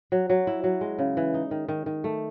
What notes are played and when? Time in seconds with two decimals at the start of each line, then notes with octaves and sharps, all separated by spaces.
0.12 F#3
0.30 F#3
0.47 E4
0.64 F#3
0.81 G#3
0.99 C#3
1.17 E3
1.34 D#4
1.51 D#3
1.68 D#3
1.86 D#3
2.04 A3